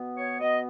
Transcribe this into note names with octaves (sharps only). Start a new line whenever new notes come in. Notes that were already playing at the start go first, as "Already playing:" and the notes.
Already playing: B2 B3
C#5
B2 B3 D#5